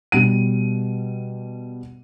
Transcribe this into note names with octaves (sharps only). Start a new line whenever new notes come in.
B2 G3 D#7